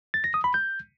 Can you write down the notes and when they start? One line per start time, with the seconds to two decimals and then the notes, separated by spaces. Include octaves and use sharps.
0.14 A6
0.24 A#6
0.34 D#6
0.44 B5
0.54 G6